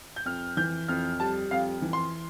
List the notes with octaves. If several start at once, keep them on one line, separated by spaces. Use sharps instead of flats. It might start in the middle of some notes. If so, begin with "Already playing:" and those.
G6
F2 F6
E3 G6
F2 F6
G3 A5
F2 F5
E3
C6